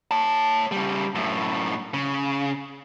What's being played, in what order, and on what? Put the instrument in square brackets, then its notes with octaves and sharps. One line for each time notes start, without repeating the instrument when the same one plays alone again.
[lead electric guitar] C#5 A5
C#3 G3
F#2 A2
C#3